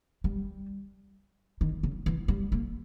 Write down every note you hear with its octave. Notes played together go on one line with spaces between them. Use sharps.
G3
D#3
C#3
E3
G3
A#3